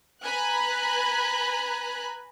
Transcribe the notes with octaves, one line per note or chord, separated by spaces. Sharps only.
B4 G#5 A#5 B5 F#6